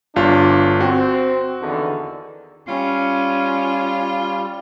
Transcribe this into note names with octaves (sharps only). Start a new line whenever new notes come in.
G1 D4 F4
C4 F#4
E2 D3 D#3
G3 C#4 F4